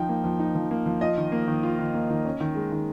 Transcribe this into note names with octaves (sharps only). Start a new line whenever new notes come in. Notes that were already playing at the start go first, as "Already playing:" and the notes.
Already playing: F3 D#4 G5
A#3
F3
D#4
F3
A#3
F3
F4 D#5
D#3
A#3
D#3
F4
D#3
A#3
D#3
C#4
D#3
G#3
D#3